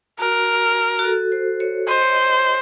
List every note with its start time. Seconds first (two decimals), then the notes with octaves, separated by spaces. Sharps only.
0.20 F#4 A#4
0.99 F#4
1.04 A4
1.32 C5
1.60 C#5
1.88 C5 D#5
2.01 C#5
2.15 D#5